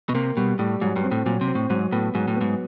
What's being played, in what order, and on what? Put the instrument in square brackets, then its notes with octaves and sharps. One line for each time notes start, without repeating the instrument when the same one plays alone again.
[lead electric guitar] B2
[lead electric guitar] C3 [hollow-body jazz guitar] A#3
[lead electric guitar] B2 [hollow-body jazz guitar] G3
[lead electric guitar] A2 [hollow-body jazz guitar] G3
[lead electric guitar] G#2 [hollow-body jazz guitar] F#3
[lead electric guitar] G2
[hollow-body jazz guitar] C4
[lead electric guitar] A2
[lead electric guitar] A#2 [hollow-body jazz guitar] F#3
[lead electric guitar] C3
[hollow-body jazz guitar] C4
[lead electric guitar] A2
[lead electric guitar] G#2 [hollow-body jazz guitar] F#3
[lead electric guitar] A2 [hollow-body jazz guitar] B3
[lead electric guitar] G#2 [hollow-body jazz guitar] F#3
[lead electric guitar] A2
[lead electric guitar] G#2 [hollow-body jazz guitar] B3